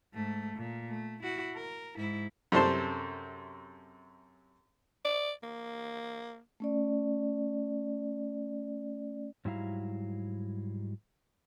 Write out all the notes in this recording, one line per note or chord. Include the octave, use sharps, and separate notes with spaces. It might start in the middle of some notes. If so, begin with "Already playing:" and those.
G#2 A3
A#2
A3
E4 F#4
A#4
G#2 E4
F#2 C3 A4 C5 A5 C6
D5
A#3
A3 C#4 D5
G#2 F#3 G3 E4 F5 A#5